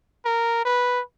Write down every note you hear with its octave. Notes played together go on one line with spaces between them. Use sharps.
A#4
B4